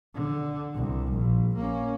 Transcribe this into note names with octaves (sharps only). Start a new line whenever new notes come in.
D3
C2
A#1
A#3 C#4